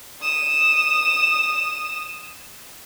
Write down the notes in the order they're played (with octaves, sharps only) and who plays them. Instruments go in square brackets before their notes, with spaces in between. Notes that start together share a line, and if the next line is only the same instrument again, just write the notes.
[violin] D#6 E7